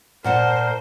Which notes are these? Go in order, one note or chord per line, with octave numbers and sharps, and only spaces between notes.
A#2 A#4 C5 F#5 A5